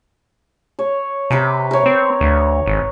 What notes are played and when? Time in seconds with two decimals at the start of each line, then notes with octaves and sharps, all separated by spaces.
0.79 C#5
1.30 C3 B4 G5 A#5
1.71 A#4 C#5
1.86 C4
2.20 D2
2.66 G#1